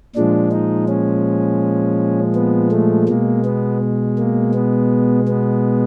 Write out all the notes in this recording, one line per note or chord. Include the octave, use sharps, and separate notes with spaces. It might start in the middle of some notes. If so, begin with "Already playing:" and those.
A#2 F3 G#3 D4
D#4
C#4
B3
A3
B2 G#3 A#3
B3
A#3
B3
B3